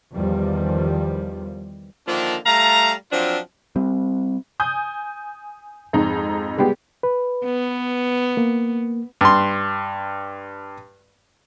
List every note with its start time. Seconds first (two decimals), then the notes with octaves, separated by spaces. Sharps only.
0.14 E2 D#3 F3 G3
2.08 D3 D#3 F3 A#3 D4
2.46 G3 A3 F5 A#5
3.12 F3 F#3 C4 D4 F4
3.76 G3 C4
4.60 G#5 D#6 G6
5.93 F2 G#2 D#4
6.58 G3 G#3 B3 G4
7.03 B4
7.45 B3
8.37 A#3
9.21 G2 C6